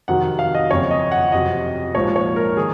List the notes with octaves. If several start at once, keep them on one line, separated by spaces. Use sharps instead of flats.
F2 C3 D#3 F#3 F#5
F#5
F5
D#5
F#1 F2 C#3 C#5
D#5
F#5
F2 C3 F#3 D#5
A#1 G#2 F3 C#5
C#5
A#4
D#3 G#4